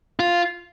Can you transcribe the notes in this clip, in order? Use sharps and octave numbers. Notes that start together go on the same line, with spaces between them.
F4